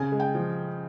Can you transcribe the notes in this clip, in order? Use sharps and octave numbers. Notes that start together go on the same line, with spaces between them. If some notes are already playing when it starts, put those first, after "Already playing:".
Already playing: C#3 G#5
G#3
G5
F3